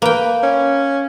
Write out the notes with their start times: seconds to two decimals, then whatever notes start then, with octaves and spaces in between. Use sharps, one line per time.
0.02 A#3 B4 G5
0.43 C#4